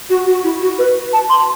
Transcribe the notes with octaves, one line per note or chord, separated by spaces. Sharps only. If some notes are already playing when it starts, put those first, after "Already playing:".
F#4
F#4
E4
F#4
B4
A5
C6